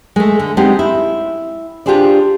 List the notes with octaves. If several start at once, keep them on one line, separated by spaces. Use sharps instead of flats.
G#3 A3
D3
G#3 B3 C4 D4 D#4 G4
E4
D4 F4 G4 G#4 C5 D5